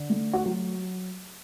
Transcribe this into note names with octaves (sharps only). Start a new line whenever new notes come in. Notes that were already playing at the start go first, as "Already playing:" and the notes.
Already playing: D3
A3
F#4
F#3